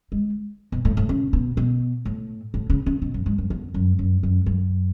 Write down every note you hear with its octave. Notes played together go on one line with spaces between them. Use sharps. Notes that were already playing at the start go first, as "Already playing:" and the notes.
G#3
B2
A2
A2
C#3
B2
B2
A2
A2
C#3
C#3
B2
F#2
G#2
F#2
E2
F#2
F#2
F#2
F#2